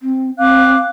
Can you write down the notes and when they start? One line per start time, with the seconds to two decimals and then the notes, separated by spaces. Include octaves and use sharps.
0.01 C4
0.38 C4 F5 D6 F#6